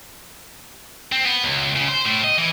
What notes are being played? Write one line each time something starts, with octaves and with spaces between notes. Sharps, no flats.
C4
B3
C#2
C#3
C5
A2
D#5
E3